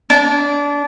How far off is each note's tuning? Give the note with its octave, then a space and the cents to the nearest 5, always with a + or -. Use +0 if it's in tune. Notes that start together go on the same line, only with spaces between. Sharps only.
D4 -25